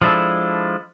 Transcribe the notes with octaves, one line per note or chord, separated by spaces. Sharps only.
F3 G#3 D4 E4 A4